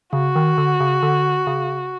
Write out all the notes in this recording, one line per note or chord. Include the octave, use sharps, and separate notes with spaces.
C#3 F#4
D#3
D3
C#3
D3
C#3